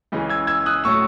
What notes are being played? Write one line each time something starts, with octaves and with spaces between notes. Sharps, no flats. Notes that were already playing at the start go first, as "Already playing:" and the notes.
C#2 C#3 E3
E6 G#6
E6 G#6
D#6 F#6
A2 F#3 C#6 E6